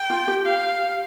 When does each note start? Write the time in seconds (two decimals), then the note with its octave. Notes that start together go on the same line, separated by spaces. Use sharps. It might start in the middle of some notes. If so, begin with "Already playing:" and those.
Already playing: G5
0.10 F4
0.28 G4
0.45 F5